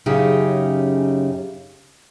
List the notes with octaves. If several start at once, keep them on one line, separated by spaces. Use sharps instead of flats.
F#2 C#3 C#4 D#4 G4 G#4